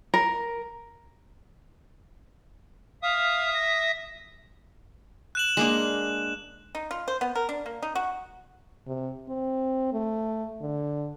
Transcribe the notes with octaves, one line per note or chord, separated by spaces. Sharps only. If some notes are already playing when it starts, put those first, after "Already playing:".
A#4
E5 F5 D#6
A#6
F#6 E7 F#7
G#3 A#3 D4
D#4
F4
C5
B3
A#4
D4
A#3
D#4
F#4
C3
C4
A3
D3